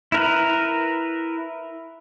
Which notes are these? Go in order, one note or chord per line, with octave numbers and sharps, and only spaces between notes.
E4 A#4 B4